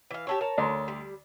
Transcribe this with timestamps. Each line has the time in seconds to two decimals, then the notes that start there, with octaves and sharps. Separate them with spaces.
0.11 E3 F5
0.27 G4 A4 C#5
0.41 A#4 C#5 A5
0.58 D2 A#5 C6
0.88 G3